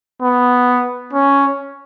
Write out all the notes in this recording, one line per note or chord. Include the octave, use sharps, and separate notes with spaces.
B3
C#4